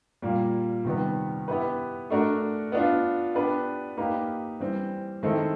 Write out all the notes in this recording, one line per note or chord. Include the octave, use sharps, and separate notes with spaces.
A#2 G3 A#3
C3 D#3 G3 B3
B3 E4 G4 B4
A3 D4 F#4 A#4
B3 D4 F4
B3 D4 G4 B4
A#3 D#4 G4 B4
E3 G3 C4
D#3 G#3 C4 E4 A4